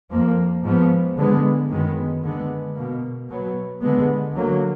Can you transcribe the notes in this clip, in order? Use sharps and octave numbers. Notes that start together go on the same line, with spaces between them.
F2 F3 A#3
G#2 F3 B3
D3 G#3 B3
F#2 D#3 G#3 B3
D3 G#3 B3
B2 A#3
B2 F#3 B3
D3 G#3 B3
D3 F#3 A#3